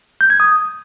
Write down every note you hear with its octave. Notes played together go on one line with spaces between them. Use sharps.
G6
G#6
D#6